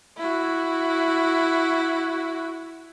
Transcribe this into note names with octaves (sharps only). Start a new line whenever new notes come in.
E4 F#4